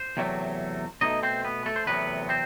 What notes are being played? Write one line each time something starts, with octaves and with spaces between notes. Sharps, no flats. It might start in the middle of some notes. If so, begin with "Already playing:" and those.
Already playing: C5
E2 C3 F#3 A3
B2 A3 D#4 D#5
C4 C5
B3 B4
A3 A4
C5
E2 C3 F#3 A3 B3 B4
C4 C5